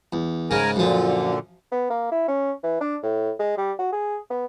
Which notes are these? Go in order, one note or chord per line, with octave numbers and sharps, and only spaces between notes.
E2
G#2 C#3 G#3 A#4 G#5
F#2 A#2 D3 F3
B3
A#3
E4
C#4
E3
D4
A2
G#3
G3
F#4
G#4
B3